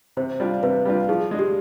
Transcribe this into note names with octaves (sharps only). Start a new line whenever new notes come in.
C3 C5
G3 D4 F4
C3 B4
G3 D4 F4
F3 G#4
G#3 D4
G4